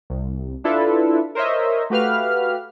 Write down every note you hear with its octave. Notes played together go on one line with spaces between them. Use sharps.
C2
D4 E4 F4 A4 B4 E5
A#4 C5 C#5 D#5 E5
A3 F#4 G4 B4 F5 F6